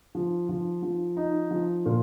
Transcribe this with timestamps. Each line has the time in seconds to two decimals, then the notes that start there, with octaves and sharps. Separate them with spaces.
0.15 F3
0.49 F3
0.83 F3
1.17 D#4
1.51 F3
1.86 A#2